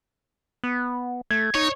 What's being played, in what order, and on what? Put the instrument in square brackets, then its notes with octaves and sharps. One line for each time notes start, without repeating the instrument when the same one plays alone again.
[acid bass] B3
[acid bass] A3 [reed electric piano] G#6
[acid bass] D#4 [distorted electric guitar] C#5